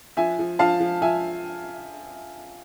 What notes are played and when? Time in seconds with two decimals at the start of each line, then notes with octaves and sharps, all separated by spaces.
0.17 F3 E5 G#5
0.39 F3
0.59 F3 F5 A5
0.80 F3
1.02 F3 E5 G#5